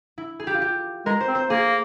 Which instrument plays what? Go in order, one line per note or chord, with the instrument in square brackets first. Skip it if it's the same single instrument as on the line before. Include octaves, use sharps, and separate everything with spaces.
[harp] E4
G#4
G4
F4
G4
[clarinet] G#3 [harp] A#4
[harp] C5
[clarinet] C4
[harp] C5
[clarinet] A#3 [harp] G#4